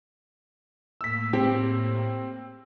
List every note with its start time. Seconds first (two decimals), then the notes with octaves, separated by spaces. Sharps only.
1.01 A2 A#3 E6 B6
1.33 C4 G4